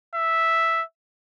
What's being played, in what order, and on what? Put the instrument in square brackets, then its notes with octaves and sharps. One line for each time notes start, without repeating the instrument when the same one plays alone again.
[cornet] E5